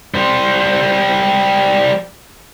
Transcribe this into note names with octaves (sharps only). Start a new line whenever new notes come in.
G3 C5